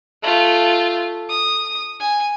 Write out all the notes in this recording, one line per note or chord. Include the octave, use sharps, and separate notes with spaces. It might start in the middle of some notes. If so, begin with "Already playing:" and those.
A3 F4
D#6
G#5